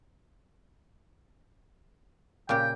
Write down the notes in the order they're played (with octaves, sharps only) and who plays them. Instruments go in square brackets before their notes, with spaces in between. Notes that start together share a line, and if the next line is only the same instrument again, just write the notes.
[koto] A#2 C#3 G4 [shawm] G5